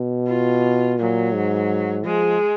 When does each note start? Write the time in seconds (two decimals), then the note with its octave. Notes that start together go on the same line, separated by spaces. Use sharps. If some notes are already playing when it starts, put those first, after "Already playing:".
Already playing: B2
0.28 F4
0.99 A#2 F#3
1.35 G#2
2.05 F3 G#3